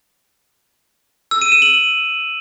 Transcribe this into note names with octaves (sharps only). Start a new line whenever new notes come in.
E6
D#7
E7
F#7